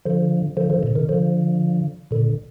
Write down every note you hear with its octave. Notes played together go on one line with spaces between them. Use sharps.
D3 F3
D3 F3
D3 F3
A#2 D3
C3 D#3
D3 F3
A#2 D3